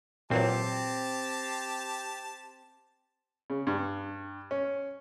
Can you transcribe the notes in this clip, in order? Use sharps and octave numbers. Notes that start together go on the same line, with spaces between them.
A#2 E3 F#3 C4 G4 A5
C#3
G2
C#4